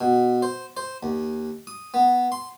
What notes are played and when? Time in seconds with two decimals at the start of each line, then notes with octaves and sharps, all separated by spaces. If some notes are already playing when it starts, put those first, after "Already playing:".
0.01 B2
0.42 C5
0.77 C5
1.03 D#2
1.67 D#6
1.94 B3
2.32 C6